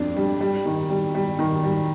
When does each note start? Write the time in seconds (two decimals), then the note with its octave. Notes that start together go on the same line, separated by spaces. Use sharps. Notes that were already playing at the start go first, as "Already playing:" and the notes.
Already playing: F2 D4
0.16 G3
0.41 G3
0.65 D#3
0.90 G3
1.15 G3
1.39 D#3
1.63 G3